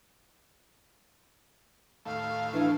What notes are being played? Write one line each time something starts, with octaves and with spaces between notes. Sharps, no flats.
D#2 A2 A3 F5
E3 D4